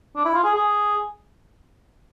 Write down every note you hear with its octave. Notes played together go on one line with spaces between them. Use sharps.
D4
E4
F4
G#4
G#4